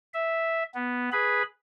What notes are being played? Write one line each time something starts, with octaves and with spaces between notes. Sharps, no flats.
E5
B3
G#4 B4 B5